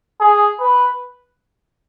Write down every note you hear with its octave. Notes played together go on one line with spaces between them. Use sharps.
G#4
B4